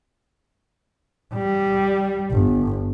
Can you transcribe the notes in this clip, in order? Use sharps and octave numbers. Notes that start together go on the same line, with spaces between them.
G3
G1